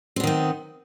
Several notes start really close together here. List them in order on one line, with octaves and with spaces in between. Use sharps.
C4 B3 D#3 D#4